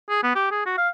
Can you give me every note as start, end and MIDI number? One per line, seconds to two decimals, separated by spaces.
0.09 0.21 68
0.23 0.33 59
0.35 0.47 67
0.51 0.65 68
0.66 0.76 66
0.78 0.89 77